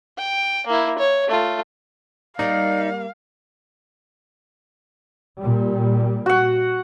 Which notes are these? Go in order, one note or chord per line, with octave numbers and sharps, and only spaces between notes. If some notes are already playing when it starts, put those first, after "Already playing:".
G5
A#3 E4
C#5
A3 F4
G3 A#3 D#4 D5 F5
A#2 G3
F#4 F#5